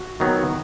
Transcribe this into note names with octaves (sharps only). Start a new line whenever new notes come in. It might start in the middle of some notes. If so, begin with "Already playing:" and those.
Already playing: F#4
D#3 F#3 B3